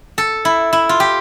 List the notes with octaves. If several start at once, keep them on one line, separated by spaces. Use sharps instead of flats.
A4
E4
E4
F4
G4